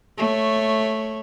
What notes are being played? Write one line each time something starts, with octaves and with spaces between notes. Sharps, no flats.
A3 C#5